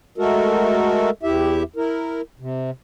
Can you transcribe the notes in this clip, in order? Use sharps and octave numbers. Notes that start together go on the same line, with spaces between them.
G#3 A3 F#4 A4 A#4
E2 E4 G4 E5
E4 A#4
C3